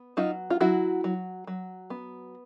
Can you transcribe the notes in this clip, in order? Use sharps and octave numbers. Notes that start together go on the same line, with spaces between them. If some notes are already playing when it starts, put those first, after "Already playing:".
Already playing: B3
F#3 D#4 F4
F4
F#3 E4 F#4
F#3
F#3
B3